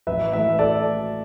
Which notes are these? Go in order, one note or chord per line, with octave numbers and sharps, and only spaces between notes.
A1 B4 E5
A2 E3 A3 B4 E5
A4 D5